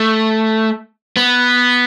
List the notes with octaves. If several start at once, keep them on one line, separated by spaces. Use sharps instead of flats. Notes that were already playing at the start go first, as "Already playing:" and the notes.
Already playing: A3
B3